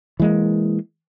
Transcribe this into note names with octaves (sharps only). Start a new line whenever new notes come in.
E3 G#3 A#3